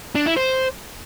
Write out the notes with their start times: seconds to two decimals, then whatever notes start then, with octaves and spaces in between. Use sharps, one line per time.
0.15 D4
0.26 E4
0.37 C5